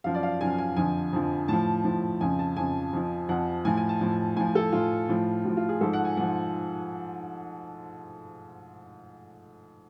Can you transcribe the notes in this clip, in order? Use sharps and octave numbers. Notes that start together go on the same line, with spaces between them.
F#2 F3 F5
D5
F5
F#2 F3 G#5
G#5
F2 D3 F3 G#5
F2 D3 F3
A2 F3 A5
A2 F3
F2 C#3 F3 G#5
A5
F2 C#3 F3 G#5
F2 F3
F2 F3 F#5
A2 F3 G#5
G#5
A5
A2 F3
A2 F3 G#5
A4
A2 F3 F4
A2 F3
A2 F3 F#4
F4
G#4
G#2 F3 A4
F#5
G#5
G#2 F3 F#5